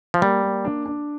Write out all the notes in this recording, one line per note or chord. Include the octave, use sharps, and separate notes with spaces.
F3
G3 A#3
A#3
D4
D4